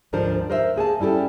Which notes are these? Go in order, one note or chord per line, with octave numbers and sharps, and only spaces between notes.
D2 G#2 F3 D4 A#4 C5
A#4 C5 D#5 E5
A#3 G#4 F#5 A5
G3 C#4 E4 G4 A4